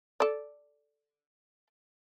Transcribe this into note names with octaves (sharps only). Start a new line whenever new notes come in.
A4 D5